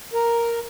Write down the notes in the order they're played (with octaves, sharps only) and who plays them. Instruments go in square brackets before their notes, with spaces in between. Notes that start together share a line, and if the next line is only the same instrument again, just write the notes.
[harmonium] A#4